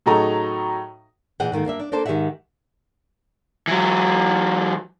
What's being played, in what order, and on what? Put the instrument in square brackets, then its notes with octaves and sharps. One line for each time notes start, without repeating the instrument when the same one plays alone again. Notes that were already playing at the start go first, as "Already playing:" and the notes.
[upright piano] A2 C#3 F#3 D#4 A4 A#5
[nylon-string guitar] A#2 E3 G#4 D#5 F#5 G5
G#2 D#3 A3 A#3
G2 A#3 D4 E5
D4
A#3 D4 A4 C5 A5
G#2 D#3 G4 G#4 E5 F#5
[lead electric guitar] E3 F#3